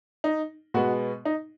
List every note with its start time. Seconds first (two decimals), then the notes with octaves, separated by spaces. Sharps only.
0.24 D#4
0.74 B2 G#3 B3 F#4
1.25 D#4